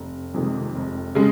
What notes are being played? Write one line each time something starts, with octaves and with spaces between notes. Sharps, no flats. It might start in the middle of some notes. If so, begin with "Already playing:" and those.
Already playing: F1
F2 C3 D#3 G#3
F1
C#3 G#3